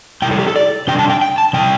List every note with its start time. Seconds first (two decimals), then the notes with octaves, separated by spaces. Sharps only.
0.22 C3 G3 E4 G5
0.31 A4
0.39 G4
0.47 A4
0.56 D5
0.87 C3 G3 D4 G5
0.99 A5
1.10 G5
1.22 G5
1.38 A5
1.53 C3 G3 E4 G5